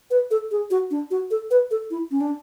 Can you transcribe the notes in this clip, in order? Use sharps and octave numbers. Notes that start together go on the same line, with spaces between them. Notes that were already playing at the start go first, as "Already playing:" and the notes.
B4
A4
G#4
F#4
D4
F#4
A4
B4
A4
E4
C#4
D4